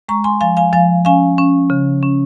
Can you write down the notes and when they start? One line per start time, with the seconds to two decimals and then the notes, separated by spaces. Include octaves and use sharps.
0.09 G#3 A#5 C#6
0.24 G#5 C6
0.41 F3 F5 G#5
0.57 F5 G#5
0.73 F3 F5 G#5
1.05 C#4 F5 G#5
1.38 C#4
1.70 C#3
2.03 C#4